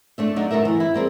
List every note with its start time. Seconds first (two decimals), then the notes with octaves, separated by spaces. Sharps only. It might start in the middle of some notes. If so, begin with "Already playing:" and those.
0.18 A3 D4 E5
0.36 F#3 D4 D#4
0.51 A3 D#4 F#4 A#4 E5
0.65 E3
0.80 E4
0.94 G3 A#3 C4 G#4